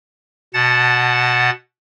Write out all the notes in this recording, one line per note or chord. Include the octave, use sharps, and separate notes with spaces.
B2 F#5 A5 A6